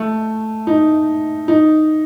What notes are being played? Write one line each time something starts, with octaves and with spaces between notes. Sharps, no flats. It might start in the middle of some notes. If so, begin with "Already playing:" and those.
Already playing: A3
D#4
D#4